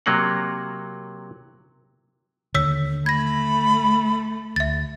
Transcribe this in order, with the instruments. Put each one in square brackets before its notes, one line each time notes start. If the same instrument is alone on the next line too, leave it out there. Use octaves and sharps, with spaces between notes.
[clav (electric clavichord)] C3 F#3 A#3 F#5
[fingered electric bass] D#2 D3 [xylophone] C#5 E6 B6
[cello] A3 [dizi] B5 [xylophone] G#6 A#6
[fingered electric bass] D2 [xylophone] E5 A6